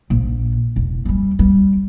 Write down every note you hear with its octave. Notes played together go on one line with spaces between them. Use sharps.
A#1
E1
E3 G3
G3